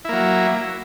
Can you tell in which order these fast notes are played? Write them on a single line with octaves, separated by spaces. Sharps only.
E4 A#3 F#3